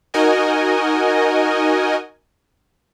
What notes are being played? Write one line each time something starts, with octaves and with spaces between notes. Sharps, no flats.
D#4 F#4 A#4 D#5 G#5